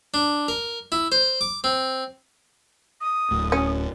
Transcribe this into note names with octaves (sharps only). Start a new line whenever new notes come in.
D4
A#4
E4
C5
D6
C4
D#6
D1 A2
C#4